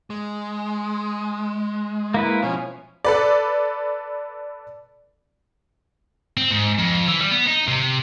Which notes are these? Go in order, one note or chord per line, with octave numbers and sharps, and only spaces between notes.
G#3
A#3 E4 B4
B2 F3 C#4
A4 B4 D5
C4
G#2
F2
E3
G3
B3
D#4
C3